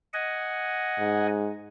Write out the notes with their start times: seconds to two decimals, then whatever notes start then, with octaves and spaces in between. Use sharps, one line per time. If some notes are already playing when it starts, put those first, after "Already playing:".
0.13 D#5 F#5 G#5
0.98 G#2